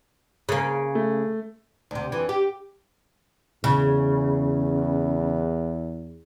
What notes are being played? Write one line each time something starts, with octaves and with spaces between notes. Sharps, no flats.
C#3 A#3
A3
D2 C3
F2 E3
G4
E2 C#3